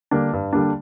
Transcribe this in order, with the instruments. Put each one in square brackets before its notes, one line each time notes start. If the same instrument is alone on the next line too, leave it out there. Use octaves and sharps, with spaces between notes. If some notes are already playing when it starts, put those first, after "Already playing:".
[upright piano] D3 G3 A#3 D4
G2
D3 G3 A#3 D4